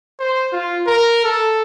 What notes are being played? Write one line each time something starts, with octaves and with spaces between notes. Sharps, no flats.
C5
F4
A#4
A4